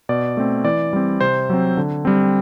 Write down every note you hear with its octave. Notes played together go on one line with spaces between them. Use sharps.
B2 D5
A3 C4
E3 D5
G3 C4
C3 C5
F#3 C4
D3
G3 C4